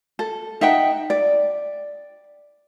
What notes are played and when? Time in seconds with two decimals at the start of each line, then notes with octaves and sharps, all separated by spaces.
0.19 A4
0.61 D#4 E5 F#5 G5
1.10 D5